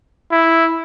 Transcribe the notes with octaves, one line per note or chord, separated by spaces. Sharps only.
E4